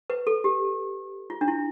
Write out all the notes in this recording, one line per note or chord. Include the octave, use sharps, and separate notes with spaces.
B4
A4
G4
F4
D4
E4